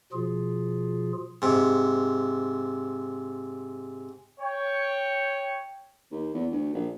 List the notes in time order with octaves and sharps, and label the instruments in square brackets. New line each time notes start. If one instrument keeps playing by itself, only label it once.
[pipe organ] B2 F3 F4 G#4
[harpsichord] G#2 C3
[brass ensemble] C#5 G5
[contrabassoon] D#2
E2
D2
A#1